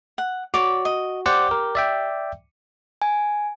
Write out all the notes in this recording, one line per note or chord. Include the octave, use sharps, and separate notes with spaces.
F#5
F#4 C#5 D5 D6
D#5
G4 C5 D5 F#5
A#4
D5 E5 G5
G#5